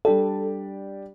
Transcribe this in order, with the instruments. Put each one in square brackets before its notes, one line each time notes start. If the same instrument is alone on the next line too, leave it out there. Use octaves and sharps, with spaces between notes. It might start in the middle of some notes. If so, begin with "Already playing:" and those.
[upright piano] G3 D4 G4 D5 [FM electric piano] A4